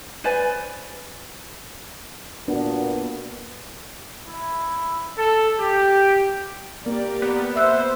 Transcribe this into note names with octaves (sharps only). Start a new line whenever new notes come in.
B4 C5 D5 G#5
A#2 A#3 B3 D4 F#4
E4
A4
G4
A#3 G4 A#4 D5
B3
C5 E5 E6 F#6